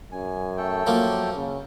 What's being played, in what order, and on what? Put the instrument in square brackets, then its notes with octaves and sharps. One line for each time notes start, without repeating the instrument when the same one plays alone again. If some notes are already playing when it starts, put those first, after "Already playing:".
[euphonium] F#2 [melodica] G#5
[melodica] A3 A4 G5
[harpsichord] F3 A#3 [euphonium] F#3
[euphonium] C#3